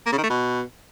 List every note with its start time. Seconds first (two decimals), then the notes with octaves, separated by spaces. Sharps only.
0.06 A#3
0.12 C#3
0.18 D#3
0.24 A3
0.30 B2